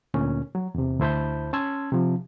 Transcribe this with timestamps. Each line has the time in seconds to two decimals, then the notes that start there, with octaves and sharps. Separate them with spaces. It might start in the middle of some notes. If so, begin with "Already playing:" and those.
0.14 D2 A#2 C#4
0.55 F#3
0.75 E2 C3
1.00 D2 E4 C5 A5 B5 G6
1.53 C#4 A5 C6 E6 G#6
1.92 C3 F3